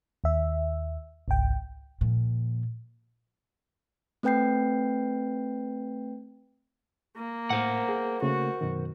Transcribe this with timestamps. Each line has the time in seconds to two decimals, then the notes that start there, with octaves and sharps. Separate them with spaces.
0.24 D#2 E5
1.28 G#1 C#2 G5
2.01 A#2 F3
4.23 A3 C4 B4 G5 G6 C7
7.17 A#3
7.50 A2 A#4 C5 F#5
7.89 G#4
8.22 C#3 A3 A#3 F#4
8.61 F#2 B2 D#3